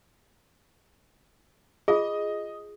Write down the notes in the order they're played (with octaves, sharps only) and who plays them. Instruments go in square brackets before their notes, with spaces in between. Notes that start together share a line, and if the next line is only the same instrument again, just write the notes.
[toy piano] F4 G#4 [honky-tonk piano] D#5